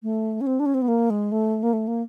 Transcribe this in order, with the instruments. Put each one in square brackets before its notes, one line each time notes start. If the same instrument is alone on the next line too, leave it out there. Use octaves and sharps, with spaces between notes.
[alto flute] A3
C#4
C4
D4
C#4
C4
B3
A#3
G#3
A3
A#3
A3
A#3